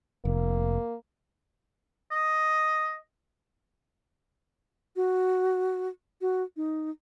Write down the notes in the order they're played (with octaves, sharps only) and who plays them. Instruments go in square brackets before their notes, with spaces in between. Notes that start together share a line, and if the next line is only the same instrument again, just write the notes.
[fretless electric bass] F1 [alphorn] A#3
[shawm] D#5
[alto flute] F#4
F#4
D#4